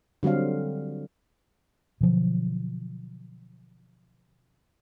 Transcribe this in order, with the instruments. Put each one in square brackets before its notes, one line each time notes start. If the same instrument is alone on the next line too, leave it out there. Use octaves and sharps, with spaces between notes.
[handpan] D3 F#3 G3 C4 F5
[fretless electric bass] B2 D3 F3 F#3